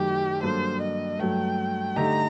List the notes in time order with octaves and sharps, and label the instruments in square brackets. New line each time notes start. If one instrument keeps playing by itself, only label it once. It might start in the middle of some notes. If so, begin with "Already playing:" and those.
Already playing: [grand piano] F#2 D#3 F#3 A3 [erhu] G4
[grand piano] G2 F#3 A#3 D4 A4 [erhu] C5
[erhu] D#5
[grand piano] G2 F#3 A3 [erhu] G5
[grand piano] D3 A3 D#4 G4 [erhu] A#5